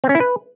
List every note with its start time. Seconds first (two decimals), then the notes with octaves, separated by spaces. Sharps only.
0.04 C4
0.09 C#4
0.15 E4
0.20 B4